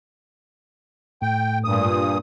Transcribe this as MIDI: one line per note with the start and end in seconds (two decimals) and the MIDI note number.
1.22 1.88 45
1.22 1.59 79
1.64 2.18 43
1.64 2.18 46
1.64 2.18 87